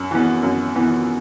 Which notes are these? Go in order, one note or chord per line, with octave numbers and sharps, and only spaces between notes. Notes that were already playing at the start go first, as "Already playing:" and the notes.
Already playing: F#2
E3 B3
F#2
E3 B3